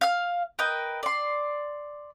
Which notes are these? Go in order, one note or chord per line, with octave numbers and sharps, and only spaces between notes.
F5 F6
A#4 B4 D#5 G5
D5 C6